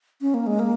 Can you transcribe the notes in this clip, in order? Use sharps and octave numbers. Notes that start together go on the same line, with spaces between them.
C#4
A#3
G#3
A#3